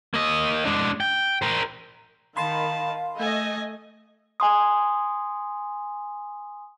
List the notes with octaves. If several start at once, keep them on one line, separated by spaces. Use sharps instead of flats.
A#3 D#5
G#3 D4
G5
A#4 C5
D#3 F5 A5 B5 C6
A3 D#5 G#5
G#5 C6 D#6